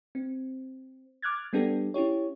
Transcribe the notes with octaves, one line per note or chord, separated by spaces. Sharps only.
C4
D6 F6 F#6 G#6 A6
G3 B3 D4 G4 A4
C#4 E4 G4 C#5